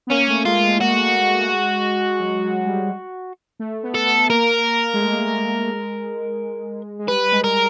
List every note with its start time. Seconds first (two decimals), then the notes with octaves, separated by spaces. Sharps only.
0.07 B3
0.11 A#3 C#4
0.28 A3
0.45 G#3 F4
0.63 G#3
0.81 F#4
2.20 F#3
2.43 F#3
2.67 G3
3.59 A3
3.83 B3
3.95 A4
4.06 B3
4.30 A#3 A#4
4.94 G#3
4.99 A3
5.12 A#3
5.22 A3
5.46 G#3
6.99 G#3
7.08 G3 B4
7.32 G#3
7.44 A#4